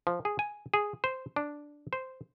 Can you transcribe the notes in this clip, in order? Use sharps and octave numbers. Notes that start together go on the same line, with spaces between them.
F3
G#4
G#5
G#4
C5
D4
C5